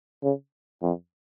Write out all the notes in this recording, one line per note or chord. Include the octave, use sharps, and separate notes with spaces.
C#3
F2